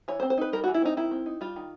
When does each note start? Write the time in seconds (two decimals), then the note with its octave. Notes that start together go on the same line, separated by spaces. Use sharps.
0.08 E3 C#5
0.20 C5
0.23 C4
0.30 C5
0.38 D#4 B4
0.52 G3 A#4
0.64 E3 F#4
0.74 E4
0.82 C4 D#4
0.97 D#3 E4
1.11 C4
1.26 D#4
1.41 G3 F4
1.56 D#3